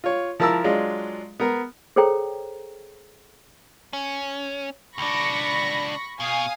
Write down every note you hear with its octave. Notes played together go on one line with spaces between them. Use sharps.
F4 C#5
F3 E4 A#4 A5 A#5 E6
F#3 G#3 D4 F4
B3 A#4
G#4 A4 C5 C#5 G5 A#5
C#4
C#2 D4 B5 C#6 A#6
B2 F5 G#5 D#6